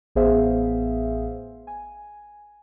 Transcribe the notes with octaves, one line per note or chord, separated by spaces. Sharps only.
A1 B3 G#4 C5 E5 F5
G#5